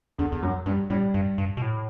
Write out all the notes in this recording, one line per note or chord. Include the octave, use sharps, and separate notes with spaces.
E2 D3
E2
F#2 F#3
G2 G3
A2 G3
G2
G2
B2
A2